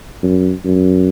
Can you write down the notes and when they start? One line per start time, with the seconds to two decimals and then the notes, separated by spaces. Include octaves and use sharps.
0.23 F#2
0.65 F#2